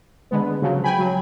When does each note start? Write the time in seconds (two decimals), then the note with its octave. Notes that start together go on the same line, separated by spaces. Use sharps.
0.31 D3 G#3 B3
0.62 C#3 F3 F#3
0.84 G5 G#5 B5
0.99 F#3